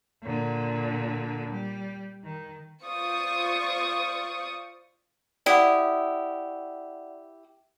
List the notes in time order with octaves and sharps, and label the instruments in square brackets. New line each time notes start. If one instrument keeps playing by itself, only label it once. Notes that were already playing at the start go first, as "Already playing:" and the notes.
[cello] A#2 D3
G3
D#3
[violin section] F4 C5 D5 C#6 D#6
[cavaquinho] E4 G4 D#6 [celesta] D5 F#5